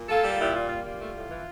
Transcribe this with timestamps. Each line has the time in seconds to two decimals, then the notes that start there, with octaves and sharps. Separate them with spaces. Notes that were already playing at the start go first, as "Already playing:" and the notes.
Already playing: A#2
0.09 A#3 F4 A4
0.23 G3
0.39 A#2 E4 G4
0.54 G3 F4
0.69 A#3 F4
0.84 G3 F4
0.99 A3
1.15 A2
1.30 E3